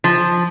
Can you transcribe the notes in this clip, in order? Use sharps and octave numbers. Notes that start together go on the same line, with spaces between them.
F3